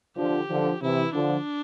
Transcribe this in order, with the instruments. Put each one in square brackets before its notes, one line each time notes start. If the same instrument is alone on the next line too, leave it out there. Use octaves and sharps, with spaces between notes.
[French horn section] D3 F3 [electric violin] G4
[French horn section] D3 F3
[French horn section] C3 E3 [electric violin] E4
[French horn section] D3 F3 [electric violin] D4